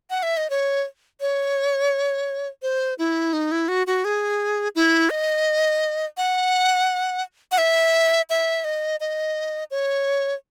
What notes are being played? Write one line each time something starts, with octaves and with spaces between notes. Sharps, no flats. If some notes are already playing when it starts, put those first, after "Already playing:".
F#5
E5
D#5
C#5
C#5
C5
E4
D#4
E4
F#4
F#4
G#4
E4
D#5
F#5
F#5
E5
E5
D#5
D#5
C#5